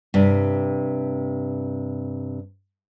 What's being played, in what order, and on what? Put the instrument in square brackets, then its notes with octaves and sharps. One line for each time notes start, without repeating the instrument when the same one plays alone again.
[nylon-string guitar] G2 C3